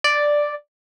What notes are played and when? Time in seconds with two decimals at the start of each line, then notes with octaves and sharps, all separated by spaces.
0.04 D5